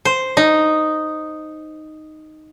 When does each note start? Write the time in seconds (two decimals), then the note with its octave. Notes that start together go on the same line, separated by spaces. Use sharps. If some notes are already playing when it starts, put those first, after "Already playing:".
0.05 C5
0.37 D#4